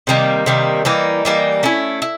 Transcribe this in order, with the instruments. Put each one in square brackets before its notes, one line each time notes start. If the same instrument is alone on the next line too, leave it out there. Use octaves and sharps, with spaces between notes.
[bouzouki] C3 D#3 G3 A#3
C3 D#3 G3 A#3
E3 G3 A#3 D#4
E3 G3 A#3 D#4
A3 C#4 E4
E4